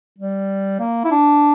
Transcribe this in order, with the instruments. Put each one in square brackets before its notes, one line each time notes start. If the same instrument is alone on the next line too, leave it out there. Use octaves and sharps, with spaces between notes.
[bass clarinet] G3
A#3
E4
D4